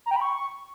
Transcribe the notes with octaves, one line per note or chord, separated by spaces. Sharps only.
A#5
G5
B5
C#6